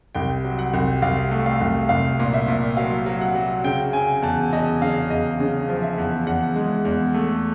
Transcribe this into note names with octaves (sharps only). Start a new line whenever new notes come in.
C2 G5
F#3
F#5
C2
C2 F5
A3
F5
C2
C2 F5
A#2
E5
A#2
F#3 F5
F#3
F#5
F#3
C#3 G5
C#3 G#5
E2 A5
E2 D#5
C#3 F5
E2 D#5
C#3
F3
E5
E2
E2 F#5
G#3
E2
A3